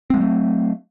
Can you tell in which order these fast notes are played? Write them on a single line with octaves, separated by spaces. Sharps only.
C4 G#3 F#3 A3